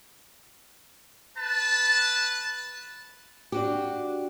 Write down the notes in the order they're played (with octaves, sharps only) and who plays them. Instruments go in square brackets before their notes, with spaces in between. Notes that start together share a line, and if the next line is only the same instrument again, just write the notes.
[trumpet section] B4 A5
[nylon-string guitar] D4 F#4 G4